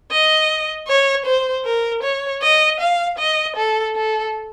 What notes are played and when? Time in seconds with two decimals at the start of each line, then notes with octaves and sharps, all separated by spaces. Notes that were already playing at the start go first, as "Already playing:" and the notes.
0.11 D#5
0.88 C#5
1.25 C5
1.65 A#4
2.03 C#5
2.42 D#5
2.80 F5
3.19 D#5
3.56 A4
3.96 A4